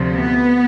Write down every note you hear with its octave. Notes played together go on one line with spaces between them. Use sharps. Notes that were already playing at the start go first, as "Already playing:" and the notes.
Already playing: D2 C3 F3
B3